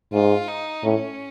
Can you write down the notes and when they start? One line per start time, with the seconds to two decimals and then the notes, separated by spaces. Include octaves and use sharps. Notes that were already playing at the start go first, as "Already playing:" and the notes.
0.13 G#2 F4
0.48 D#4
0.83 A2 C#4